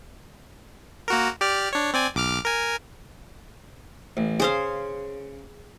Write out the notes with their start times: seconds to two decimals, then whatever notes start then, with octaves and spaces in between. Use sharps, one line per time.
1.08 A#3 F#4 A#4
1.41 G4 D5 F6
1.73 D4 C#5
1.94 C4 D5 G#5
2.15 B1 D6 F6
2.45 A#4 G#5
4.17 A1
4.40 C#3 G#4 C5 F5